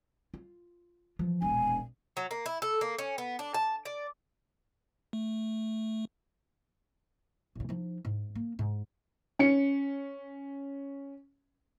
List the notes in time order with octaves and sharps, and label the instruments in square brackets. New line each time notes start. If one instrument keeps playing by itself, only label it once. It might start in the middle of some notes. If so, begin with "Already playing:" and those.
[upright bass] F4
E3 F3
[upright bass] E1 A#1 [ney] G#5
[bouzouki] F#3
A#3
E4
A4
A#3
C#4
B3
D4
A5
D5
[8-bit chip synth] A3
[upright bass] A1 C#3
F3 D#4
G#2
A#3
G#2 D#4
[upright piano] C#4 C#7